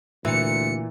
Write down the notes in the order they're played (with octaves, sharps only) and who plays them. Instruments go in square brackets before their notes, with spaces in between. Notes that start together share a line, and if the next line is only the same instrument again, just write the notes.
[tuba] D2 [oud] A#2 [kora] E3 [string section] C#7